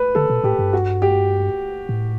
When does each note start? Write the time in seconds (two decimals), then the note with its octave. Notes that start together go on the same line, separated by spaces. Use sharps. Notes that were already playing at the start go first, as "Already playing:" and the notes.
Already playing: B4
0.15 D3 A4
0.30 B2
0.44 A2 G4
0.59 G2
0.73 F#4
1.02 G4
1.89 A2